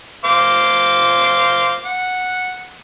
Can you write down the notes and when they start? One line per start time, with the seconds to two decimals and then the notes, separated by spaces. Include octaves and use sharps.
0.25 C5 F5 D6
1.85 F#5